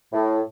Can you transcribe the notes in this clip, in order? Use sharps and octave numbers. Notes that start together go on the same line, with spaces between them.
A2